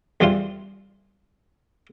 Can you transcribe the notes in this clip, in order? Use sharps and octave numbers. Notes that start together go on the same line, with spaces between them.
E2 E3 G3 F4 C5 C6